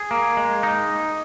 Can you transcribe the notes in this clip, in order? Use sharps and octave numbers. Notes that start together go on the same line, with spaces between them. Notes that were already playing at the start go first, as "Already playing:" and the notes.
Already playing: G#4
A#3
G#3
D#4